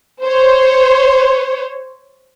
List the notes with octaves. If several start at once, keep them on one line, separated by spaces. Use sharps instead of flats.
C5 C#5